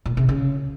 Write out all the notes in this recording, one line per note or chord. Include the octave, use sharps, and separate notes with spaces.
A#2
C3
C#3